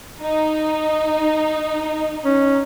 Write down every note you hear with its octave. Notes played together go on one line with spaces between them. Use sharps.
D#4
C#4